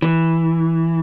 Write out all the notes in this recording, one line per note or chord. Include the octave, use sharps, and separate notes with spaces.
E3